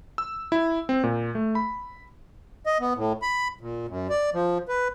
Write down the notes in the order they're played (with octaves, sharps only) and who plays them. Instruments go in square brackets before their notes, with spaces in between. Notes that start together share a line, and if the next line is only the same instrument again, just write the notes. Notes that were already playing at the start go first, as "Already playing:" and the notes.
[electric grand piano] E6
E4
C4
A#2
A3
B5
[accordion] D#5
B3
A2
B5
A#2
F#2
D5
F3
B4